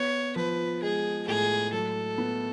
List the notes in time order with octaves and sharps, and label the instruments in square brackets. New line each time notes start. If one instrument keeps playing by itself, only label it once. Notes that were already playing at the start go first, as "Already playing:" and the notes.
Already playing: [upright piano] B3 [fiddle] C#5
[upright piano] F3 [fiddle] B4
[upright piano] G#3 [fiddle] G#4
[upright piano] A2 [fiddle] G#4
[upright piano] F#3 [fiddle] A4
[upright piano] B3